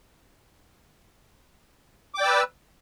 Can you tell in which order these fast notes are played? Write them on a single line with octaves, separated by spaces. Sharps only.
D6 G5 D5 E6 B4